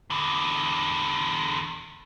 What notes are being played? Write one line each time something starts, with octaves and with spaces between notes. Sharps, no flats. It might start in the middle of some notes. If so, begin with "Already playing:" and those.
E2 D3